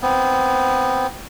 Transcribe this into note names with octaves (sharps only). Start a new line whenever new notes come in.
B3 C4